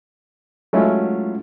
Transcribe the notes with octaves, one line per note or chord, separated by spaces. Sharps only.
F#3 G#3 A3 C#4 E4 F4